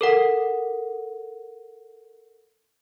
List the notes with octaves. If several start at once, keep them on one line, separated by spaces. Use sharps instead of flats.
A4 A#4 F#5